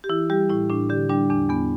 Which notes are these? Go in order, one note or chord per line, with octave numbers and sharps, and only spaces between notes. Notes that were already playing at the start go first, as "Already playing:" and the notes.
G4
E3 E4
G3 G4
A2 E4
A2 D4
D3 G4
G3 D4
E2 D4
E2 B3